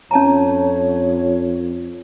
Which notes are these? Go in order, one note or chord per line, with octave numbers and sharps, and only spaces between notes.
F2 C#4 C#5 A5 A#5